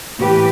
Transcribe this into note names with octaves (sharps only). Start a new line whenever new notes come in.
A2 E3 G4 B4